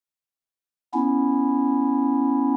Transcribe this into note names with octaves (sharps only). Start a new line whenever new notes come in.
B3 C#4 E4